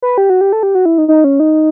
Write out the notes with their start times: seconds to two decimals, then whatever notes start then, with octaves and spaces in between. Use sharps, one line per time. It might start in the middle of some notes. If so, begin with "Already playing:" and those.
0.02 B4
0.18 G4
0.30 F#4
0.41 G4
0.53 A4
0.63 G4
0.75 F#4
0.85 E4
0.98 D#4
1.08 D#4
1.24 C#4
1.40 D#4